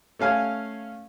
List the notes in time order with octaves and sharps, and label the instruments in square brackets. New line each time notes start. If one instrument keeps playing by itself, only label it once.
[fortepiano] A3 C#4 F5 G#5